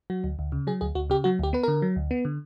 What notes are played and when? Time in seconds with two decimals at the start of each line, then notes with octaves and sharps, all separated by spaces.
0.10 F#3 F#4
0.24 D2
0.39 D2
0.52 C#3
0.67 F#3 G#4
0.81 D2 G#4
0.95 D2 F#4
1.10 C#3 G4
1.24 F#3 F#4
1.39 D2 G4
1.53 B3 B4
1.63 D3 A#4
1.82 F#3
1.96 D2
2.11 B3
2.25 D3